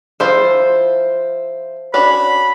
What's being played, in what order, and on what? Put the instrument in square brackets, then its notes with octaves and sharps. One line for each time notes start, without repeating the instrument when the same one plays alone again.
[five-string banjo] F3 E4 F4 [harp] C5
[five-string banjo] C#4 D4 F#4 [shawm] B5